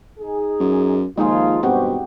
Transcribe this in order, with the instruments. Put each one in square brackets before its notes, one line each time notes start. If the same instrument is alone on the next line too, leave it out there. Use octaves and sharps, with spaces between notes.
[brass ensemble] D#4 G#4
[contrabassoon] F#2
[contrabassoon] D#2 [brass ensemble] F3 F4 [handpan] G#3 D#4 G#4
[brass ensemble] E2 G2 [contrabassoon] B2 [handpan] C4 F#4 G4